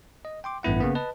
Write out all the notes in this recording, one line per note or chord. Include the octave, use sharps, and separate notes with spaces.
D#5
G5 C6 D6
A1 G2 B3 E4 F#5
C#3 A#3 B3
B4 D#5 A5